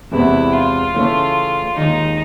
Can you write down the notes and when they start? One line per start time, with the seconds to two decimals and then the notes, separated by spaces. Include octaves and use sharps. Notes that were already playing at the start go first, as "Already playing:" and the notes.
0.12 E2 C3 E3 G#3 B3 E4
0.53 F4
0.94 C#3 E3 A3 C#4
1.76 D#2 D#3 G#3 D#4